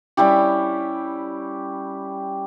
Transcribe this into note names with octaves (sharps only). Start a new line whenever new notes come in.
G3 C#4 E4 G4